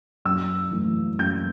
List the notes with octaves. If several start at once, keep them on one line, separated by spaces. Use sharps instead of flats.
F#2 E6
E3 A3
F#2 G6